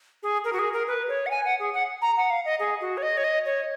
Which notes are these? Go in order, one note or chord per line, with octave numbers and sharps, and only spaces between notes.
G#4
A#4
F#4
G#4
A#4
B4
C#5
F#5
G#5
F#5
G#4
F#5
A#5
F#5
F5
D#5
G#4
F#4
C#5
D#5
C#5
D#5
C#5